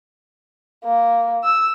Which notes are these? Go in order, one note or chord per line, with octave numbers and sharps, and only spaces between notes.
A#3
E6